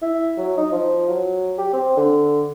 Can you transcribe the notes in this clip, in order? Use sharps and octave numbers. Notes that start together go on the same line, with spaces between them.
E4
F#3
D#4
F3
F#3
G4
C4
D3